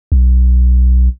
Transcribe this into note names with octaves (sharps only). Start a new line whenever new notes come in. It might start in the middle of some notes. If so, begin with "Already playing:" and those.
B1